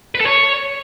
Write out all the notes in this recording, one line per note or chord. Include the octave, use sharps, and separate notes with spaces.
B4
A4
C#5